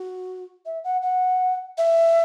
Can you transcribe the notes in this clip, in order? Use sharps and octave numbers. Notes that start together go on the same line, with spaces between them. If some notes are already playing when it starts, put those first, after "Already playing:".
Already playing: F#4
E5
F#5
F#5
E5